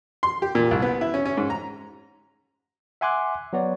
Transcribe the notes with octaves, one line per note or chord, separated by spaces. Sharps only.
C6
G4
A#2
C2
B3
E4
C#4
C#4
G#2
A#5
E5 F#5 G#5 C6 D6 F#6
F#3 B3 F#4 C#5 D5